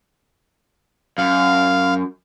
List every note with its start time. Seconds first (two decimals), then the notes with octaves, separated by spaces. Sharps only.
1.18 F#2 F5